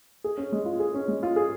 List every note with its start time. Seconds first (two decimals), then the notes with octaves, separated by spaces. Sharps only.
0.24 G#4
0.38 C#4
0.52 G#3
0.66 F4
0.80 G#4
0.94 C#4
1.08 G#3
1.23 F4
1.36 G#4